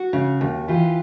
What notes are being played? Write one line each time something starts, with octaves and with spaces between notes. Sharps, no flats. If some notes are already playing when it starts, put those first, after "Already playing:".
Already playing: F#4
C#3
D#2
E3 F4 G4